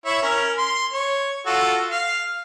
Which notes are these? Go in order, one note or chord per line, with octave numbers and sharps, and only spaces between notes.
E4 C#5 E5
C#4 A#4
C6
C#5
F4 F#4 A4
F5